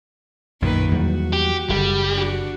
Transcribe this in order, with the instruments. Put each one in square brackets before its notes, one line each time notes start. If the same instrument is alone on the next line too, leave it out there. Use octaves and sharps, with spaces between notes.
[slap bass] B1 F#2 A#2 [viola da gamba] D#3 A#3 B4
[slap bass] E2 F#3 G3 [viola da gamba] F#4
[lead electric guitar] G4
[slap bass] F#1 D3 [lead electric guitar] G3
[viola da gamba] D4 F#4